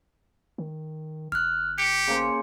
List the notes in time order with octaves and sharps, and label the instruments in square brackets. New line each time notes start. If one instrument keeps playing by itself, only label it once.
[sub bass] D#3
[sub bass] G1 [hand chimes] F6 F#6
[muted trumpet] G4 [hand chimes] C#7
[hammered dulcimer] C#3 A#3 C5